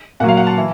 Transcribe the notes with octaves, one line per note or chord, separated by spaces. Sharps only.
A#2 F#3 F5 F#5
F#5
A5
E3